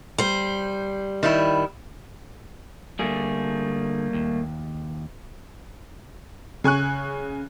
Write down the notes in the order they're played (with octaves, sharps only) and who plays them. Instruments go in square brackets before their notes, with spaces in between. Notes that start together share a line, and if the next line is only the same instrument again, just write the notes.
[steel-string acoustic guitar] G3 C5
[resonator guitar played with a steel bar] D#3 G3 E4
[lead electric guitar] D3 G#4 [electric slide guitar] G3 A3 A#3
[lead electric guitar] D#2
[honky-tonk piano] C#3 G#5 C#6 F#6